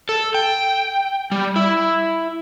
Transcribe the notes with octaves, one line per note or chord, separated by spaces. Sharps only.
A4
G5
G3
E4